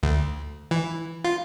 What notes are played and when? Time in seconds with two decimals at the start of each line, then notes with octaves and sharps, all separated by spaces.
0.03 D2
0.71 E3
1.24 F4